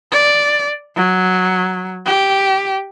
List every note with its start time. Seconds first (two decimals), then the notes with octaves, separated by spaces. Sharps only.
0.12 D5
0.96 F#3
2.06 G4